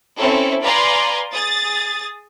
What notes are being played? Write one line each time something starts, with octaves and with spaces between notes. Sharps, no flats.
C4 C#4 E4 A4
B4 D5 F5 G#5 A#5 C6
G#4 D#6 A6